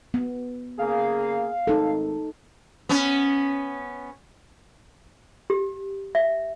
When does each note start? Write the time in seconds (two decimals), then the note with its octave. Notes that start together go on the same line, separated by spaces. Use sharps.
0.14 B3
0.79 C#3 A#3 G#4 F5
1.67 G#1 D#4 A4
2.89 B3 C#4
5.50 G4
6.15 E5